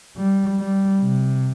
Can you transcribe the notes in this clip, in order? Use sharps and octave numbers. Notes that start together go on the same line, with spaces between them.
G3
G3
C3